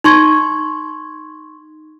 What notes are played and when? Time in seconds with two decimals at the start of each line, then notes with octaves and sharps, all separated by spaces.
0.04 D#4 C6 C#6 G#6